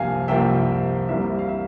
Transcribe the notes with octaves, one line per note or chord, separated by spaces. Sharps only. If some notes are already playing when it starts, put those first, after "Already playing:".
Already playing: C2 C3 F3 A#3 F5 G#5
C2 C3 F3 A#3 E5 G5
C2 C3 E3 G3 A#3 E5
F5
E5